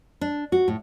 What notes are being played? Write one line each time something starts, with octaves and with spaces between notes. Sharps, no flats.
D4
F#4
A2